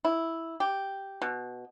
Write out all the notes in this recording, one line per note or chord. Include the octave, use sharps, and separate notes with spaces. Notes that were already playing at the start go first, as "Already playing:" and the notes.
E4
G4
B2